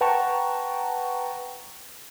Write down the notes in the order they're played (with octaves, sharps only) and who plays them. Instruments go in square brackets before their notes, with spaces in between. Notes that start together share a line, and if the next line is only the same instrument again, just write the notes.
[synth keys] B4 F#5 G5 A5 A#5 C#6